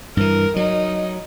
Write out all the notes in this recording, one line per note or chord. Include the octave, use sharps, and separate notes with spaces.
G2 E3 A#4
F#3 D#4